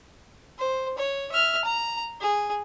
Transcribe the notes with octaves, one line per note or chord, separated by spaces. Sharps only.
C5
C#5
E5 F6
A#5
G#4